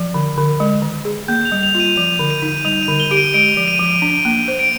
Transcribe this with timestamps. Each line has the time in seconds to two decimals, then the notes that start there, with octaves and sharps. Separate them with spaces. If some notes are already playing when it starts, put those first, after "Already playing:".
Already playing: F3
0.14 D3
0.38 D3
0.60 G#3
0.82 D#3
1.05 G#4
1.28 A#3 G6
1.45 F7
1.52 G3
1.63 F7
1.75 F4
1.80 D#7
1.97 F3 F7
2.19 D3
2.30 D#7
2.42 D#4
2.65 G3 F7
2.83 D#7
2.88 D3
3.00 G7
3.11 G4 D7
3.17 D#7
3.34 G#3 D7
3.57 F3
3.68 D#7
3.79 F3
4.02 D4
4.25 A#3
4.48 C5
4.59 D7